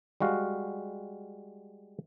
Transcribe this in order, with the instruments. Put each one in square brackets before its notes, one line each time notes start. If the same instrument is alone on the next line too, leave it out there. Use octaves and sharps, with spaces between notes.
[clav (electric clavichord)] G3 G#3 F#4 F5